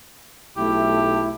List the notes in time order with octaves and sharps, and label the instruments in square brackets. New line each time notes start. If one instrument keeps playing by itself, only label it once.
[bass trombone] B1 [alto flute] A3 [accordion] E4 [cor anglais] G4